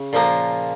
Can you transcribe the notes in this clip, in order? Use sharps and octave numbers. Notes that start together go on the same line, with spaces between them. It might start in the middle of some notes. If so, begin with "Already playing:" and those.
Already playing: C#3
A#2 F3 A#3